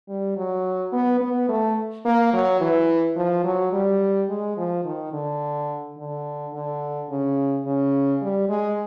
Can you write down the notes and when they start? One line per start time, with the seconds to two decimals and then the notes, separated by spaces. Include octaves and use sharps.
0.09 G3
0.37 F#3
0.93 B3
1.21 B3
1.49 A3
2.05 A#3
2.33 F#3
2.61 E3
3.16 F3
3.44 F#3
3.72 G3
4.29 G#3
4.57 F3
4.85 D#3
5.13 D3
5.97 D3
6.54 D3
7.10 C#3
7.65 C#3
8.22 G3
8.49 G#3